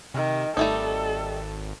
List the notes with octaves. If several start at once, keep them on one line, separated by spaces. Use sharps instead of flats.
C3 D#3
G#1 G3 A3 D#4 A4